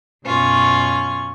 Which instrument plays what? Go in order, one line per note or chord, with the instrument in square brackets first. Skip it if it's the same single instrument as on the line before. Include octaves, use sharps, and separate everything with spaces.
[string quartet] F#2 B2 C#4 F4 C#6